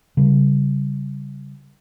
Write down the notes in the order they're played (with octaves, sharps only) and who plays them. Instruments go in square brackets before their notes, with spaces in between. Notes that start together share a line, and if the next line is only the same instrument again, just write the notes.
[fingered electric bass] C#3 G3